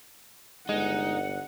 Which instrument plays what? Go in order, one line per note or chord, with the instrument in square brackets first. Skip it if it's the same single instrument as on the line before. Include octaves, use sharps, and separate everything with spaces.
[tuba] G1 [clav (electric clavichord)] G#3 [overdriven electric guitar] D#4 [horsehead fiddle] F#5